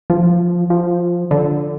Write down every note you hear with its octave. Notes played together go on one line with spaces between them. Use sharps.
F3
F3
D3